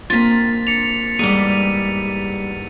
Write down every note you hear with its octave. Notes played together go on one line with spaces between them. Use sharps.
A#3 C4 D4 F4 A#5 A6 B6
D4 C#7 F7
E2 G#2 G3 G#4 D6 D#7